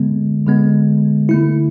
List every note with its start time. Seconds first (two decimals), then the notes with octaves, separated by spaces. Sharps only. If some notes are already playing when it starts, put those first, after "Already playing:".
Already playing: D3 G#3 B3
0.47 D3 G#3 B3
1.29 D3 A3 E4